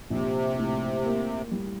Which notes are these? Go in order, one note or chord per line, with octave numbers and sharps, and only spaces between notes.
A#1 C3
A2
A#3
G3